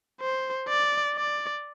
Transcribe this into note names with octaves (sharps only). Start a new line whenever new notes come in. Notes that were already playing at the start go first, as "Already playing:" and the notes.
C5
D5
D5